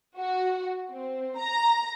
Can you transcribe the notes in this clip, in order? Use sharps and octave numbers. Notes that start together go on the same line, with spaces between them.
F#4
C4
A#5